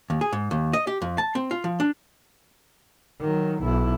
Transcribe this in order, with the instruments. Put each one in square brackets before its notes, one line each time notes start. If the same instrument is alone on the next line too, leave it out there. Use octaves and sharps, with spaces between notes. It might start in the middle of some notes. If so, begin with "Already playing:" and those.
[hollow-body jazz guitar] D#2
G#4
G#2
D#2
D#5
G4
F2
A5
C4
F4
F3
D4
[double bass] D#3 F#3
B1 E4